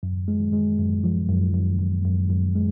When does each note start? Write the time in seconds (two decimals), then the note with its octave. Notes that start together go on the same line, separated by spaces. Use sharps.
0.03 F#2
0.28 G#3
0.53 G#3
0.79 F#2
1.04 F3
1.29 F#2
1.54 F#2
1.79 F#2
2.05 F#2
2.30 F#2
2.55 G#3